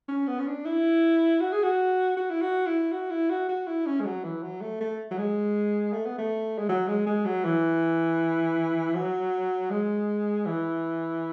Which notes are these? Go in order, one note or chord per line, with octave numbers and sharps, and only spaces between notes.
C#4
B3
C#4
D4
E4
F#4
G#4
F#4
F#4
E4
F#4
E4
F#4
E4
F#4
F#4
E4
C#4
G#3
F#3
E3
F#3
A3
A3
F#3
G#3
A3
B3
A3
G#3
F#3
G#3
G#3
F#3
E3
F#3
G#3
E3